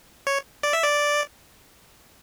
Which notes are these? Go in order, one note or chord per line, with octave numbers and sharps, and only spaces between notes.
C#5
D5
E5
D5